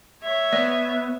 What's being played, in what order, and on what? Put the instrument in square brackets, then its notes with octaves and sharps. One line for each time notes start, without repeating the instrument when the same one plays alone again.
[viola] C#5 E5
[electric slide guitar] B3 [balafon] D5